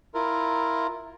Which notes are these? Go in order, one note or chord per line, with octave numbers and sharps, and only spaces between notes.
E4 F4 A#4